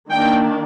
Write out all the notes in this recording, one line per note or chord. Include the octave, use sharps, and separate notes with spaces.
D#3 A#3 D4 G5